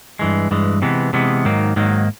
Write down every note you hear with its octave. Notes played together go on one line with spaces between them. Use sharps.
G2 E3 G#3
G2 E3 G#3
C3 E3 G#3 B3
C3 E3 G#3 B3
G#2 D#3 F#3 A#3
G#2 D#3 F#3 A#3